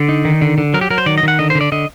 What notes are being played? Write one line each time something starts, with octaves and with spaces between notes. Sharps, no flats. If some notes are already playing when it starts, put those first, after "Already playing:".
Already playing: D3 D5
D#4
D#3
D3
D3
F#3 A#4
G4
F#3 A#4
C5
D#3 D5
D#5
D#3 F#5
D3 D#5
C5
D3
D5
D3 D#5